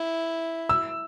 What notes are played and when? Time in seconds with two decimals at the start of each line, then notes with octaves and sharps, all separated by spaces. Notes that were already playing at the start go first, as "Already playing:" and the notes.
Already playing: E4
0.69 E6